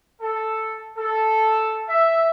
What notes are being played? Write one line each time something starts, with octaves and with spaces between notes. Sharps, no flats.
A4
A4
E5